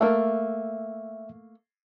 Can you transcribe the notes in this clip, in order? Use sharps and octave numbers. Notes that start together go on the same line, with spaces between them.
A3 A#3 E5